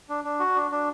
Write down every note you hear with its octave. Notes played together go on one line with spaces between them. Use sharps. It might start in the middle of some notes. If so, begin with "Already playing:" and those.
D4
D4
F#4
D4
D4